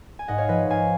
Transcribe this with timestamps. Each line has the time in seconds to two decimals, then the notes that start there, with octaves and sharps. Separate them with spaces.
0.19 G#5
0.28 G#2 D#5 F#5
0.38 C#5 F5
0.48 F3 B4 D#5
0.69 G#2 F5 G#5